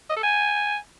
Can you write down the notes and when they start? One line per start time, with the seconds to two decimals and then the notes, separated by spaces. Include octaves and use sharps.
0.10 D#5
0.17 A4
0.23 G#5